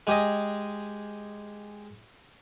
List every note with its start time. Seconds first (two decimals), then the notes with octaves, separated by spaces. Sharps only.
0.07 G#3 G4 G#4 D#5